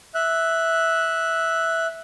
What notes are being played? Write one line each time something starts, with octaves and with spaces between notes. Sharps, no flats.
E5 F#6